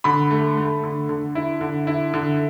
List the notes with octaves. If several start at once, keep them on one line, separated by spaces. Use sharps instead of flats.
D3 B5
A3
A3
D3
D3
E4
D3
E4
D3